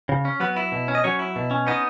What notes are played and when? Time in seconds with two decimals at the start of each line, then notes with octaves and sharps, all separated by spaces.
0.09 C#3
0.25 C#4
0.40 F#3 B3 B4
0.56 E4
0.72 B2
0.88 C#4
0.95 D#5
1.04 F#3 C#4 C#5
1.19 E4
1.36 B2
1.51 C#4
1.67 B3 D#4 D#5